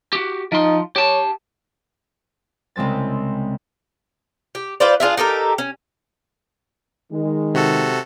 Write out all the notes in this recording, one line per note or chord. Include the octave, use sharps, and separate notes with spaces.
F#4 G4
F3 D#4 C6
G4 C#5 A5
C2 C#3 G#3 C4 A6
G4
F4 B4 C5 D5
D4 F4 G#4 E5
D#4 G4 A4 A#4
C#4
D#3 G#3
C3 F#4 A4